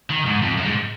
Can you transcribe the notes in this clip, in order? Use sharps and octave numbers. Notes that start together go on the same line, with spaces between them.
D#3
G#2
F2
F#2
G#2